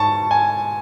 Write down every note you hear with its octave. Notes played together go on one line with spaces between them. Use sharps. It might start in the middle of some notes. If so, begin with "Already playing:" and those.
Already playing: G#2 A5 C#6
G#5